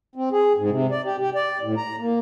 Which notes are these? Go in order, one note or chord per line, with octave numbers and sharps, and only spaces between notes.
C4
G#4
G#2
C3
D5
G4
G4
D5
A2
A#5
A#3